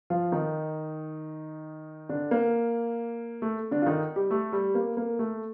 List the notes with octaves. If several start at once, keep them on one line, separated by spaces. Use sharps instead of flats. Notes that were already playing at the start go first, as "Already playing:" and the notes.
F3 F4
D#3 D#4
D3 D4
A#3
A3
D3 D4
F4
D#3 D#4
G3 G4
A3 A4
G3 G4
A#3
A#3
A3